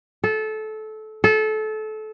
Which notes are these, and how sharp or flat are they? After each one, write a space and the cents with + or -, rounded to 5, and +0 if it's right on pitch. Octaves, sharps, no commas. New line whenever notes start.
A4 -20
A4 -25